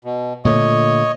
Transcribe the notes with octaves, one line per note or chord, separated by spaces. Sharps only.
B2
A#2 D3 A3 C#5 D#5